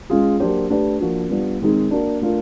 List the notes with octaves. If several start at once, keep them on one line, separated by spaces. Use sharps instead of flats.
G#3 C#4 F4 G#4
F#3 A#3 D4 G4 C5
A3 D4 G4 B4
F3 A#3 D4 F#4
G3 B3 D4 F4
D#3 G#3 C4 D#4 G#4
A#3 D4 F#4
A3 D4 F4 A#4